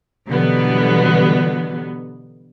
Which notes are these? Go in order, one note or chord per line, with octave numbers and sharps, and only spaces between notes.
B2 D3 E3 F#3 G3 B3